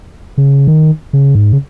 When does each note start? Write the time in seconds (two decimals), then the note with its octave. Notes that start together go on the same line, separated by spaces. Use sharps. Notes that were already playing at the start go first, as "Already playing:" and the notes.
0.38 C#3
0.67 D#3
1.13 C#3
1.35 G#2
1.52 C#3